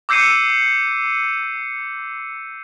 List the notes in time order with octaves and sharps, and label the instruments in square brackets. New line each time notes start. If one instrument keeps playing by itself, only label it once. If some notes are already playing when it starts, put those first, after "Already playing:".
[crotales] D6 E6 G6 C7 C#7 D#7